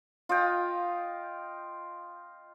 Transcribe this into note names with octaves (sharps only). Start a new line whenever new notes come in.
F4 D#5 G5